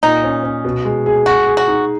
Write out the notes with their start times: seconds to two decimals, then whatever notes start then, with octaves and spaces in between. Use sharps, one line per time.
0.03 A#2 D#4
0.24 C#4
0.43 C#4
0.64 B2
0.85 G#3
1.06 G#4
1.26 F#4 G#4
1.47 G#4
1.57 F#4
1.67 D#4